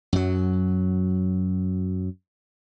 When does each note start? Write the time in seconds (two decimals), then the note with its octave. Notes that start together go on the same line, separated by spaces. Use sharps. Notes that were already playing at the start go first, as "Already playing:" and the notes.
0.13 F#2 F#3